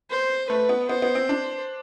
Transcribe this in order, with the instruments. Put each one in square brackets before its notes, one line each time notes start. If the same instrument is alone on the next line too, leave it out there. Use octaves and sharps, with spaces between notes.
[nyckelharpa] C5
[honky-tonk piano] A3 [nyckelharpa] B4
[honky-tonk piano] B3
[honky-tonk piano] B3 [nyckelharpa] C5
[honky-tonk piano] B3
C4
D4